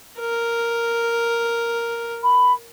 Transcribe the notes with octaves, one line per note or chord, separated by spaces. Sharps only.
A#4
B5